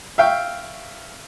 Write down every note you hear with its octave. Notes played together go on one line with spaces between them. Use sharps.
E5 F5 G5 C#6